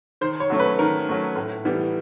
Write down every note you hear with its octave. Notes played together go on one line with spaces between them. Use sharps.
D#3 C5
C#5
F#3 A3 C#4
B4
D#3 A#4
F#3 A3 C#4
A2
E3 G3 B3